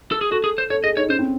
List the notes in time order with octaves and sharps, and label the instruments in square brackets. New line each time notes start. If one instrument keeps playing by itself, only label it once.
[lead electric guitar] A4
G#4
[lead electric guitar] F#4 [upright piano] A4
[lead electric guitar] G#4
C5
[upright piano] A4 [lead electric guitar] C#5
[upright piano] G#4 [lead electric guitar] D#5
[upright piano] D#4 [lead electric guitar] C#5
[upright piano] C#4 [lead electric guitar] C5
[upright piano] C4